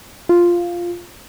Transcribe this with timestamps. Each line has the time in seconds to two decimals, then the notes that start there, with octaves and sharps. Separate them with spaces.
0.29 F4